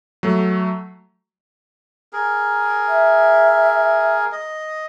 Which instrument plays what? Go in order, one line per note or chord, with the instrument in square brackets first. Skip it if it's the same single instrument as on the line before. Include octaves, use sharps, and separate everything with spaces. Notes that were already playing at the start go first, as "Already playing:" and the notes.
[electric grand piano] F#3 A3
[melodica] G#4 A#4
[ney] E5
[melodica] D#5